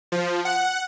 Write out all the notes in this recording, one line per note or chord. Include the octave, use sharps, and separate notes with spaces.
F3
F#5